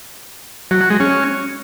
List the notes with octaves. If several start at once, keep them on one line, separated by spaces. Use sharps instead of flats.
F#3
F#4
G#3
C#4